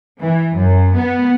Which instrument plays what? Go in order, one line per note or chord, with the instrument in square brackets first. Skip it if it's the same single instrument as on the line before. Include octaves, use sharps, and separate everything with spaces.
[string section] E3
F#2
B3